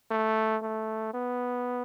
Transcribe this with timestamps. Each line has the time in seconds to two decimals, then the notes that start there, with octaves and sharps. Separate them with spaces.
0.11 A3
0.63 A3
1.14 B3